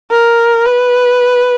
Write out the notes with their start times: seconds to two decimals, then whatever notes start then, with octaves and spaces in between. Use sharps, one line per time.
0.11 A#4
0.66 B4